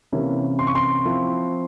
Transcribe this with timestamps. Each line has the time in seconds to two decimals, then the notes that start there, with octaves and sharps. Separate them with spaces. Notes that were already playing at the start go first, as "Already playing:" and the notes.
0.12 C3 E3 A#3 C#4 E4
0.59 C6
0.67 C#6
0.75 C6
1.05 F3 C4 E4